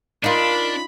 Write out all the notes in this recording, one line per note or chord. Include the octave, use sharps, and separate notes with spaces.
D4 D#4 F4 A#4 B5